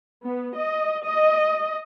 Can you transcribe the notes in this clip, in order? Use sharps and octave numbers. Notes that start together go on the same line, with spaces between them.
B3
D#5
D#5